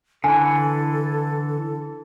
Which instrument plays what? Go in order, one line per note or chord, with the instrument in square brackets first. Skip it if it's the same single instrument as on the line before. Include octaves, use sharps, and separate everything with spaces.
[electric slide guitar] D3 E3 [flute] A4 [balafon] G#5